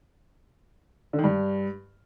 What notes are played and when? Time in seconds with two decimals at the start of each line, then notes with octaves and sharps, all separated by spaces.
1.13 D3
1.19 D#3
1.24 G2